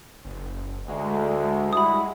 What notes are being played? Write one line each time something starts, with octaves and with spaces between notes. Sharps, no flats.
F#1
D2 G#3
G3 E4 F#4 B5 D#6